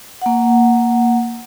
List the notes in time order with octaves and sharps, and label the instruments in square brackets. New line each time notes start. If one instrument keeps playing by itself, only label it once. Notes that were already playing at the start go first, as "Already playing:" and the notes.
[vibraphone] A#3 F#5